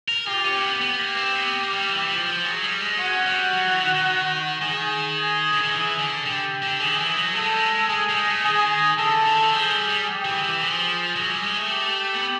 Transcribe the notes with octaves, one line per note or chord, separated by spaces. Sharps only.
A#4
F4 G4
C#4
A#3
B3
B3 G4
A#3
C4
B3
A#3
G3
E3
F3
F3
F#3 G#4
G3
G#3
C#4 F#4
G3
F#3
E3
D#3
D#3
D#3 G#4
D3
D#3
E3
D3
D3 G4
D3
D#3 G#4
E3
F#3
A3 A4
G#3
G3
G#3
G#3 G#4
G3
G#3
A3
D#3 G#4
D3 A4
D#3
F3 G#4
G3
G3
G4
E3
E3
F3 G#4
F#3 G#4
G3
G#3
A3
G4
B3